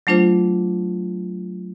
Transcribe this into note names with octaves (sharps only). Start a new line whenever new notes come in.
F#3 A3 D4 F4 C5